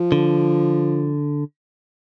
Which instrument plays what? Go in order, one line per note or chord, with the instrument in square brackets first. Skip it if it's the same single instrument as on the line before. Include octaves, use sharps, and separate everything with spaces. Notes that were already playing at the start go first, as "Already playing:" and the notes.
Already playing: [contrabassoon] F3
[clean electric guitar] D3